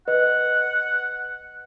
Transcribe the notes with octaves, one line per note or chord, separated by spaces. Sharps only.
B4 D#5 F#5